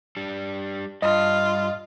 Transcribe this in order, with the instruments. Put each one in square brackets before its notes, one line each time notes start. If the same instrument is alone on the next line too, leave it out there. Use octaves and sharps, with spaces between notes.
[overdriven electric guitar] G3 D4
[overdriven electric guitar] G2 [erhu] F4 [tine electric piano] D#5